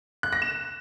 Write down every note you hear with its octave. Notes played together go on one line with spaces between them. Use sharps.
F#6
A#6
E7